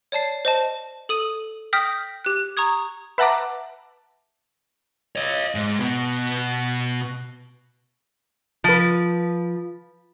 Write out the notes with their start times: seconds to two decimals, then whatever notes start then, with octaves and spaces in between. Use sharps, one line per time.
0.12 C#5 D5 A5 C7
0.45 C5 D#5 A5
1.09 A4 D#6 D#7
1.73 G5 D#6 F6 G6 A#6 B6
2.25 G4 F#6
2.57 A#5 C#6 D#6 G#6
3.18 B4 E5 F#5 A5 A#5 D6
5.16 C#5 D#5
5.55 G#2
5.80 B2 B3
8.64 F3 B4